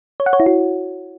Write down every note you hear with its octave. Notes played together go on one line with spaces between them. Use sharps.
C#5
F#5
C#5
E4
F#4